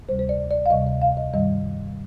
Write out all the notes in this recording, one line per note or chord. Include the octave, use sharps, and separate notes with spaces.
D2 C3 G3 C5
C5
D5
D5
F5
D2 C3 G3 D#5
D#5
F5
D#5
G2 D#3 G3 D#5